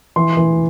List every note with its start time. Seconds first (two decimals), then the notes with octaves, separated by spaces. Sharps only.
0.16 E3 C6
0.37 E3